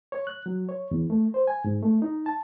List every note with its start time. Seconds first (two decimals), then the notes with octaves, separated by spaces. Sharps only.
0.12 C#5
0.27 F#6
0.46 F#3
0.69 C#5
0.91 E2
1.10 A3
1.34 C5
1.47 G#5
1.64 G#2
1.83 A3
2.02 D#4
2.26 A5